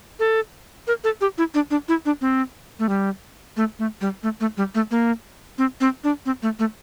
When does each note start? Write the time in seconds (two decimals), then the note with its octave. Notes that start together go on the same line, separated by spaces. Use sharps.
0.20 A4
0.88 A#4
1.04 A4
1.21 G4
1.38 E4
1.54 D4
1.71 D4
1.88 E4
2.06 D4
2.21 C4
2.79 A3
2.89 G3
3.57 A3
3.79 A3
4.01 G3
4.23 A3
4.40 A3
4.57 G3
4.75 A3
4.91 A#3
5.58 C4
5.81 C4
6.04 D4
6.26 C4
6.43 A3
6.59 A3